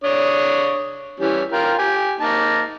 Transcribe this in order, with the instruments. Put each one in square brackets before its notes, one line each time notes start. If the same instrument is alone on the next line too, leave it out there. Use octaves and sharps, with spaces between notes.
[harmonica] D4 C#5 D#6
E3 G3 C#4
F4 A#4 G5
G4 G#5
A#3 D#4 A5